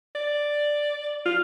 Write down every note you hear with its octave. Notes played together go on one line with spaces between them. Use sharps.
D5
F4